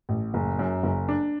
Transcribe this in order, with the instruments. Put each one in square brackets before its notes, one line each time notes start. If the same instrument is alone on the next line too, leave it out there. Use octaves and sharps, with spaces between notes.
[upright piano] A1
F#1
F#2
F#1
D4